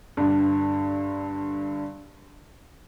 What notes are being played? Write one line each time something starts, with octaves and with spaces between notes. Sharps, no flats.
G2 D3